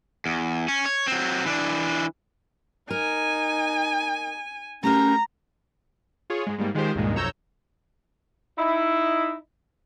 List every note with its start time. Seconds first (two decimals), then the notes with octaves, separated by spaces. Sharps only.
0.26 E2
0.68 C#4
0.86 C#5
1.07 F#3 C4
1.46 E3 D4
2.90 D#4 A#4 G#5
4.83 A3 C#4 G4 A#4 A#5
6.30 F4 G#4 C#5
6.47 G#2 G#3
6.58 G#2 G3 A#3
6.75 D#3 G#3 F4 G4 C5
6.95 C#2 G2 A#2 D#3 G#3
7.15 B1 F2 C#5 A#5 E6 G6
8.58 D#4 E4